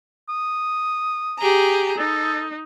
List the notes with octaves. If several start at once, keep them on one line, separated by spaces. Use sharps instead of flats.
D#6
G4 G#4 A#5
D#4 A4